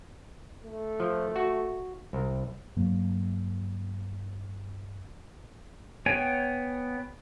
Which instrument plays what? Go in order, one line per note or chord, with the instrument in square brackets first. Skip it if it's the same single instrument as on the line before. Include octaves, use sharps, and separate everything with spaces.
[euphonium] A3
[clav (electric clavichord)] F3
F#4
C2
[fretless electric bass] G2 F#3 A#3
[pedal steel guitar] B3 C#5 G5 G#5